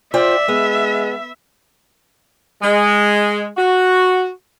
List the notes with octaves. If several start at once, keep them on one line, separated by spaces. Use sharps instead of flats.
F4 C5 D5 E5 G5
G#3 B3
G#3
F#4